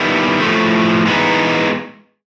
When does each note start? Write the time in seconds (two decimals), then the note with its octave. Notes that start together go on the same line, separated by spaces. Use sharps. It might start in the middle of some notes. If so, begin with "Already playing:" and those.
Already playing: D#3 G3 B3 E4
0.41 A2 F3 A3
1.06 E3 G#3 B3 D#4